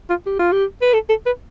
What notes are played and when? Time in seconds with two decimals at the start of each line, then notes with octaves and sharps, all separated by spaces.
0.10 F4
0.27 G4
0.39 F4
0.52 G4
0.82 B4
0.94 A4
1.10 A4
1.26 B4